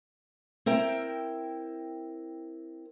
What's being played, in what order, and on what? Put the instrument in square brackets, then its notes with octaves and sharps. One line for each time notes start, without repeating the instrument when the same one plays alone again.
[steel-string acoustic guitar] C4 E4 A#4 G5